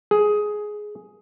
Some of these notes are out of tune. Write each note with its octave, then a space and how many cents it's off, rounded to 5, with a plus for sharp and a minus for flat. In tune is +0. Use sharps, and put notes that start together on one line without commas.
G#4 +10